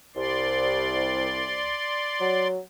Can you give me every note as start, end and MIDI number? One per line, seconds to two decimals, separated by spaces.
0.16 1.72 36
0.16 2.47 74
0.16 2.47 84
2.20 2.59 54